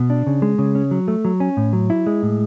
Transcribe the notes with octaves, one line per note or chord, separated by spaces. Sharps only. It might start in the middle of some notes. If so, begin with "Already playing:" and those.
Already playing: B2
D4
C#3
G#3
C#3
C#4
F#3
A3
F#3
C#4
A2
F#3
E4
G#3
A2